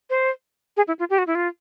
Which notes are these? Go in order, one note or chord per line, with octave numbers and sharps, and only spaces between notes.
C5
G#4
E4
F4
G4
F#4
E4
F4